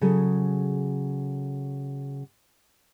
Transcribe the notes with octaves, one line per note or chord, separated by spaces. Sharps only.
C#3 F#3 G#4 A4